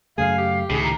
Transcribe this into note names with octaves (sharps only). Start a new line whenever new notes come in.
F#2 C#3 A3 G#4 F5
G4
C#2 A2 C3 D#3 G#4
A#5